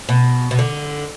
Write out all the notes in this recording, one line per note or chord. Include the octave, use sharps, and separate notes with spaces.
B2
B2
D3